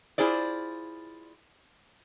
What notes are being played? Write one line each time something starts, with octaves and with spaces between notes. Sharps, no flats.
E4 F4 G#4 C5 D5